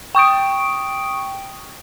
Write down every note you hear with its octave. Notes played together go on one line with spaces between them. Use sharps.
G5 C#6 D#6 D7